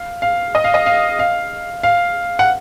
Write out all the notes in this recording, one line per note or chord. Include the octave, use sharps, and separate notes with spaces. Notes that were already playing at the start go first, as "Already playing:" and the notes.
Already playing: F5
F5
D#5
F5
D#5
F5
F5
F5
F#5